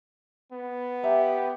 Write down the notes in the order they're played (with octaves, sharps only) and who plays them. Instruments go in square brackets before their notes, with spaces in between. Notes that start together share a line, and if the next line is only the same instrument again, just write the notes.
[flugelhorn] B3
[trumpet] G4 [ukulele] E5 A#5